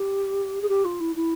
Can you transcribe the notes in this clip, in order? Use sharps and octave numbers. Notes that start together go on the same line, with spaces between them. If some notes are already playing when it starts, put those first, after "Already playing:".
Already playing: G4
G#4
G4
F4
E4
E4